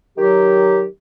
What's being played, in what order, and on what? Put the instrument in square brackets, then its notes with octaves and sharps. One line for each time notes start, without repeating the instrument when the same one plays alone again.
[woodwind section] D#3 F#3 G4